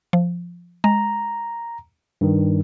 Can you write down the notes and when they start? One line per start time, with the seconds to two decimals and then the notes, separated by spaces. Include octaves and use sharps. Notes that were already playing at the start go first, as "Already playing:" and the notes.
0.13 F3
0.84 G#3 A#5
2.21 G2 D#3